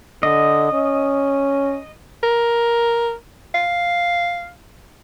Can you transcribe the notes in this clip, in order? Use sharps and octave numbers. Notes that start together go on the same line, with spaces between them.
D3 D#5
C#4
A#4
F5